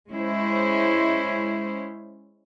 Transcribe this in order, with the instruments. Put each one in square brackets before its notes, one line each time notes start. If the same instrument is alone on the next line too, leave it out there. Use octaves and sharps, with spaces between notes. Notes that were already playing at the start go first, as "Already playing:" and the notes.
[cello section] G#3 C#4 E4 C5